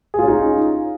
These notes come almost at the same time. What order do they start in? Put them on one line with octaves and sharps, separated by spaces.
G#4 F4 C#4 D#4